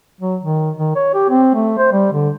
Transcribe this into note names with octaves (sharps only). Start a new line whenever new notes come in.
F#3
D#3
D#3
C#5
G4
C4
A3
C5
G3
D3